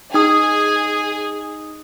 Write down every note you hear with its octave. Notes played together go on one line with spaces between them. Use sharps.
D#4 G#4 D#6